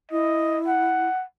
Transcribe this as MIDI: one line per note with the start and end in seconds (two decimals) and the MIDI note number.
0.11 1.08 64
0.11 0.58 75
0.67 1.23 78